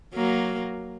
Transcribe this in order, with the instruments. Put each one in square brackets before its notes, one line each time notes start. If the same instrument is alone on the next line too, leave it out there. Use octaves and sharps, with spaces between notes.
[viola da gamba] F#3 A#3